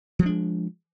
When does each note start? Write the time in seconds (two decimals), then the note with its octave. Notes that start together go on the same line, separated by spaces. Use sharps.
0.19 F3
0.22 G3
0.26 D4
0.29 G#3